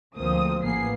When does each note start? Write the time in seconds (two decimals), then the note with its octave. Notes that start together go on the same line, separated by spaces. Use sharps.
0.16 D2 F3 A#3 C4 C5 D#6
0.61 A1 A#3 B3 G#4 C7